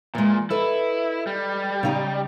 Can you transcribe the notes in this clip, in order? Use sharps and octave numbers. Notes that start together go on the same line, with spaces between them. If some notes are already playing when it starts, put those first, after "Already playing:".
A#2 E3 G#3
E4 A4 B4 D#5
G3
C#3 D#4 G4